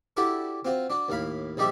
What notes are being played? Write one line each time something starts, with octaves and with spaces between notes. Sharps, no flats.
D4 E4 F#4 G4 A4
C4 F4 F#4
D4 F#4
D#2 A2 F5 B5
A#1 G3 D#4 G4 D5 E5